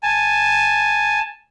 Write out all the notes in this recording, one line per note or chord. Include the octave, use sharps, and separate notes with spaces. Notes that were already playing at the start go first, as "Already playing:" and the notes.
G#5 A5